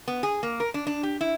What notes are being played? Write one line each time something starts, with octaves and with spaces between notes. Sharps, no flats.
B3
G#4
A#3
A#4
D4
D4
G4
E4